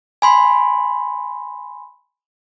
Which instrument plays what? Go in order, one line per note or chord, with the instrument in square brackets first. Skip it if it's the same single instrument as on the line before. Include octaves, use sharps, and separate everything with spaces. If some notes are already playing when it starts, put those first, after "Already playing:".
[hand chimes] G#5 B5 C6